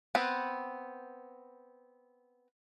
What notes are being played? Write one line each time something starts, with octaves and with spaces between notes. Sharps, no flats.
B3 C4 B4